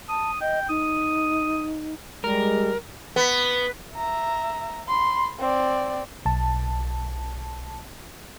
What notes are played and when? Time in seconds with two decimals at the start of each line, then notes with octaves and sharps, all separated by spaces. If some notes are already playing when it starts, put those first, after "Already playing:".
0.09 A5 D#6
0.41 D#5 G5
0.69 D#4 D#6
2.24 G3 G#3 A#4
3.16 B3
3.95 E5 A#5
4.88 B5 C6
5.40 C4 D5
6.26 B1 A5